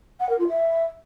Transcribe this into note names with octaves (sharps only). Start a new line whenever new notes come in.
F#5
A#4
F4
E5